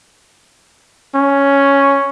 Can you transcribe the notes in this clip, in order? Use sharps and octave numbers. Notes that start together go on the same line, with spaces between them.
C#4